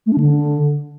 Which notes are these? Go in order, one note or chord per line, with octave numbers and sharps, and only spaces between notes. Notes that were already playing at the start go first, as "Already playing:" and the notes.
A3
D4
D3